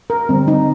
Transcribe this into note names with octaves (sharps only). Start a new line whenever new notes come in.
A#4
D3 G3 C4
D#4